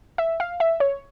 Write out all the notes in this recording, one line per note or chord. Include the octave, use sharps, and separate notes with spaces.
E5
F5
E5
C#5